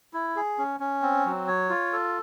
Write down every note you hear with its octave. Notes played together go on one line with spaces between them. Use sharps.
E4
G#4
C#4
C#4
C4
F#3
C#5
F4
A4